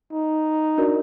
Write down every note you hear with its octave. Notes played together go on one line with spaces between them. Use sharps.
D#4
D4 F#4 A#4 D5